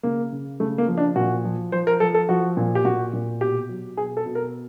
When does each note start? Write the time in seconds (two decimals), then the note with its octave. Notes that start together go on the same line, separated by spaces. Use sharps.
0.03 C#3 A#3
0.32 C#3
0.60 C#3 A3
0.78 A#3
0.88 F3
0.97 D4
1.16 A#2 F#4
1.45 F3
1.72 F3 C5
1.87 A#4
2.00 F3 A4
2.14 A4
2.29 F3 F#4
2.57 A#2
2.75 G4
2.85 A#2 F#4
3.13 A#2
3.41 B2 G4
3.69 F#3
3.97 B2 G#4
4.17 A4
4.26 B2
4.35 A#4